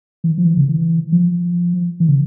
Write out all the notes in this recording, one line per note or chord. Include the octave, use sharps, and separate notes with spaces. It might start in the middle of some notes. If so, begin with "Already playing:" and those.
E3
F3
E3
C#3
E3
F3
E3
C#3